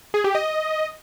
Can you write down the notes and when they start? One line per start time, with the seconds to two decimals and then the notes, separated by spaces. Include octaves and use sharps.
0.14 G#4
0.24 G4
0.35 D#5